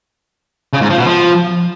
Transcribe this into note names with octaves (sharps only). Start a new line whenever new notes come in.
C#3
G#2
F3
B2
F3